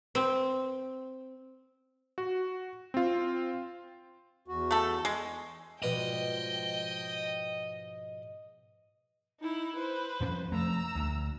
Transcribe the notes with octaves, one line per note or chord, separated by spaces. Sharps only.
C4
F#4
C4 F4
E2 F#4
A3 A4
G#3
G#2 B2 F3 B4 D5 D#5 G5
D#4 E4
B4 C5
F2 F3 C#4
F3 A3 A#5 E6
D2